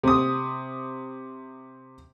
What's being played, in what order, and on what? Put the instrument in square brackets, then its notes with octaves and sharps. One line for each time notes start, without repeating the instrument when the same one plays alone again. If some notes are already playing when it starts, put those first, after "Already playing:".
[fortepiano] C3 D#6